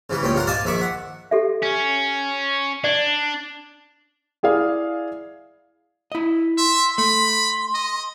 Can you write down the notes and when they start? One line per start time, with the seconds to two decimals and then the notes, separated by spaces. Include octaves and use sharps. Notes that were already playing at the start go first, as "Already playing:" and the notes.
0.10 C#3 E3 G3 B4
0.23 C#2 A#2 C#4 G5
0.35 G2 F4 A#4 F#5
0.47 D5 D#5 F5 G#5 A5
0.65 A#1 D#3 E5 B5 C#6 D6
0.81 F#5
1.31 G4 A4 E5
1.63 C#4
2.84 D4 D5
4.43 E4 G#4 D5 F5
6.12 E4 D#5
6.58 E5 C6
6.98 A3 B5 C6
7.74 D#5